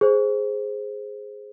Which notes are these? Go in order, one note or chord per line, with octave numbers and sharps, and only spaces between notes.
G#4 C5